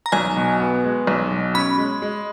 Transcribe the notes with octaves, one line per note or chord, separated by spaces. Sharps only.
A#5
B1 G#5
B2
B3
G#3
B1
B2
C#4 B5
G#3
G#3